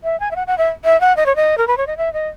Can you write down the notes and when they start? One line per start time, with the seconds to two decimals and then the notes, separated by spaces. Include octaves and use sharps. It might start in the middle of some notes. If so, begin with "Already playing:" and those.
0.04 E5
0.20 G#5
0.31 E5
0.36 F#5
0.47 F#5
0.58 E5
0.84 E5
1.01 F#5
1.17 D#5
1.26 C#5
1.36 D#5
1.58 A#4
1.67 B4
1.77 C#5
1.87 D#5
1.97 E5
2.13 D#5